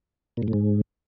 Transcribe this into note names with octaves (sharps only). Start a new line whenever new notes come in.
A#2
G#2
A2
G#2